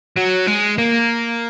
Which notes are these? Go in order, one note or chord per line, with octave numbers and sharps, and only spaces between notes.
F#3
G#3
A#3